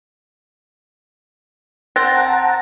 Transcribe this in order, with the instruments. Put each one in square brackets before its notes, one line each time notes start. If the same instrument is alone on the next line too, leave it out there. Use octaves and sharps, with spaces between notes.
[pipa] C4 [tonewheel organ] F#5 A5 A#5